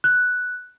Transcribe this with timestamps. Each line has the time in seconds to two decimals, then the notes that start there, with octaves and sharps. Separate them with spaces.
0.04 F#6